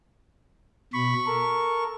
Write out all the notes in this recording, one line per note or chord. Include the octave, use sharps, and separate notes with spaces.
B2 B5 C#6
A4 A#4